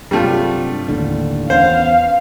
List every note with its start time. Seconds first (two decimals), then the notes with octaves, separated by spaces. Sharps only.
0.11 G2 C3 F#3 G3 A3 F4
0.88 D#2 A2 D3
1.50 E2 B3 C#4 C5 F5